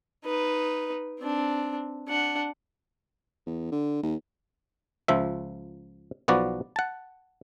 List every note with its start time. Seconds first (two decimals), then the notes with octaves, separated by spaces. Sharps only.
0.24 D#4 B4
1.19 C4 D4
2.08 D4 F#5
3.46 E2
3.71 D3
4.03 D#2
5.08 C#2 F3 E5
6.28 B1 F3 B3 F#4 D5
6.76 F#5 A5